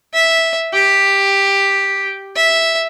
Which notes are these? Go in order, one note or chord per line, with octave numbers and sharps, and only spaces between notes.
E5
G4
E5